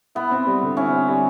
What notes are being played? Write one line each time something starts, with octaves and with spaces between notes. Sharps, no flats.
B3 E4
C4
G3
D3
C#4 E4
C4
G3